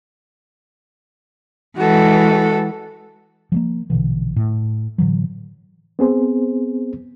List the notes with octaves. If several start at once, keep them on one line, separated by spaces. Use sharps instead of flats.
E3 G#3 F#4 A4
F3 F#3 A#3
A#1 B2 D3 E3
A2
A2 D3 E3 F#3
B3 C4 G#4 C5